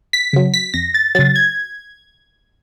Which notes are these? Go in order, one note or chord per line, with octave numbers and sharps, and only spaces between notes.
B6
C#3 F#3
B6
F2 A#6
A6
C#3 F#3 A6
G#6